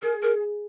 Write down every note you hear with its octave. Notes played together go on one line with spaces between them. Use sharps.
G#4 A#4
A#4